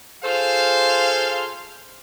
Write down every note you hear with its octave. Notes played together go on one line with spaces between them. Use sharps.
F4 G#4 A4 C5 F5